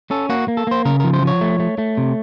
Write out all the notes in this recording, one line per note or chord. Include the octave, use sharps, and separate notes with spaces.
C#4 A4
A#3 F#4
A#3
A4
A#3 C5
C#3 A#4
F3 A#4
C5
F3 C#5
A3
A3
A3
C3